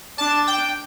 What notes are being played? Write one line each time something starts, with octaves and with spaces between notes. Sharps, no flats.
D4 A5
G5